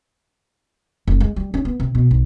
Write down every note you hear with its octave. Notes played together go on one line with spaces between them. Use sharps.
F1
G#3
G3
C#4
B3
C3
B2
B1